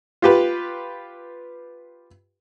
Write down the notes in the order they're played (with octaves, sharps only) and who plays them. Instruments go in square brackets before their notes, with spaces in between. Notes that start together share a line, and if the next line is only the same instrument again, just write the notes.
[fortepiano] F4 G4 B4